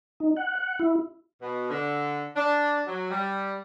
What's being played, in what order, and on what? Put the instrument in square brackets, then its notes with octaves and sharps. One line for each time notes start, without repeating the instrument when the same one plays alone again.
[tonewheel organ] D#4
F#5
F#5
E4
[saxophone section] B2
D3
D4
F#3
G3